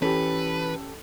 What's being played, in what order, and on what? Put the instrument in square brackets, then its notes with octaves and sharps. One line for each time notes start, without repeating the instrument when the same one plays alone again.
[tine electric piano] E3 B5 [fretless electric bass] C#4 [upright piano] G4 A4 [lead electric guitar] B4